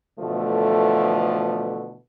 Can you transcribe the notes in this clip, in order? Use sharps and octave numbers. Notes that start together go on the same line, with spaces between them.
B2 D3 E3 F3 A3